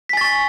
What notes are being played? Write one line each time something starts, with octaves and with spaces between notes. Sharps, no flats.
G#5 C#6 A6 B6